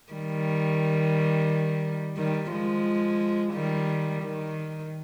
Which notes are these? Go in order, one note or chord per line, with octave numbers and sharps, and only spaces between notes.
D#3 G3
D#3 G3
F3 G#3
D#3 G3
D#3